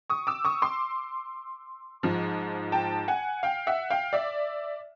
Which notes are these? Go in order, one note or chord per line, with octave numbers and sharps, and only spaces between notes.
C#6 D#6
D6 E6
C#6 D#6
C6 D6
G#2 F3
G5 A5
F#5 G#5
F5 G5
E5 F#5
F5 G5
D5 E5